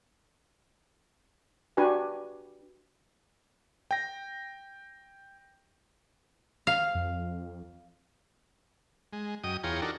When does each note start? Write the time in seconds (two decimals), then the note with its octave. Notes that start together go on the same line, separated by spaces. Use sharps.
1.77 D4 F#4 G4 B4 G#5
3.91 G5 A#6
6.67 F5
6.95 F2
9.13 G#3
9.44 F#2 D#5 G5 D#6
9.64 E2 F4 G#4 C#5 G5 A#5
9.82 D4 D#4 F#4 A4 A#4